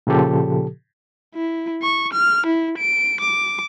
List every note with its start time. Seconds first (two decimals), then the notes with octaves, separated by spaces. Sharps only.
0.07 A#2 C#3 F3 G4 A4
1.35 E4
1.82 C#6
2.13 F6
2.46 E4
2.78 D7
3.20 D6